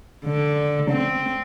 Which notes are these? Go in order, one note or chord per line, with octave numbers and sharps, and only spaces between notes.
D3
C4